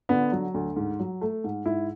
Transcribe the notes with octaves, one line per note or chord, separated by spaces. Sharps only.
D3 B3
F#3
D2
G#2
F#3
A3
G#2
G#2 E4